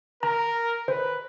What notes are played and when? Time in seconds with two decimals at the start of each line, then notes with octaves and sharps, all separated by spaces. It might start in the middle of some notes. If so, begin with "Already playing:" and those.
0.23 A#4 A#5
0.88 B4 C5